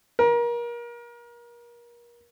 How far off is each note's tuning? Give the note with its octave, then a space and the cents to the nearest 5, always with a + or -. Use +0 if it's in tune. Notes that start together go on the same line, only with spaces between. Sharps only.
A#4 +30